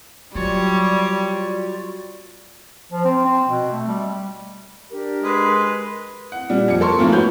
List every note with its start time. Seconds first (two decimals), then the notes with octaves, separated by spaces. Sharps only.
0.35 F#3 G3 F4 F#4 C#5 D5
2.92 F3
3.05 C4
3.25 C4
3.48 B2
3.72 A3
3.88 G3
4.91 D4 G4 A#4
5.24 G#3 B4
6.32 F#5
6.49 A#2 G3
6.68 F2 C#7
6.81 A4 A#4 C6 C#6
6.98 G#2 E3 F3 A3 A#3
7.12 F#4 B4 C#5 G6